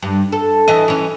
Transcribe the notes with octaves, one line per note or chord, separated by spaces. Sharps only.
G2
A4
E3 D#5
E3 C#4